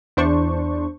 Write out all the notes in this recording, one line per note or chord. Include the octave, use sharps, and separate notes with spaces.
E2 D4 C5 C#6